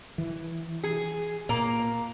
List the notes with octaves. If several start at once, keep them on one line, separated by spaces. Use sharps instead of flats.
E3
G#4
A#2 A#3